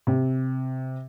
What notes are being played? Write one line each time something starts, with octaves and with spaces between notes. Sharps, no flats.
C3